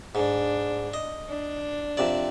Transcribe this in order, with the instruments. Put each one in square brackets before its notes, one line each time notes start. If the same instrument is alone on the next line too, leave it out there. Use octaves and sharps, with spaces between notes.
[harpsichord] G#2 [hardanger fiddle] D4
[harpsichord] D#5
[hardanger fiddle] D4
[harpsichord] F2 C3 D5